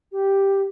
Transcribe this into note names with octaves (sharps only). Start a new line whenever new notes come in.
G4